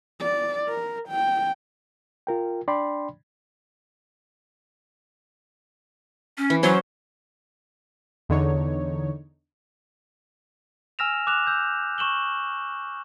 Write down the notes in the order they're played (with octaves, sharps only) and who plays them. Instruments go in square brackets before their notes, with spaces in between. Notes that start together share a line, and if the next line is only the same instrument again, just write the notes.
[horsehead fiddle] D5
A#4
G5
[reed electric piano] F4 A#4 G5
D4 D5 G5 B5 C6
[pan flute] C#4
[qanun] E3
[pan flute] F#3 [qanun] C#4 F#4 C5
[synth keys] E2 D3 D#4 C#5
[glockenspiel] G#5 E6 F6 A#6 E7 F7
D6 F#6 E7 F7
E6 G6
C#6 E7 F#7 G7